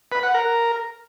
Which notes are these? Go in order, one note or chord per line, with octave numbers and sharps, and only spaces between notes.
B4
F#5
A#4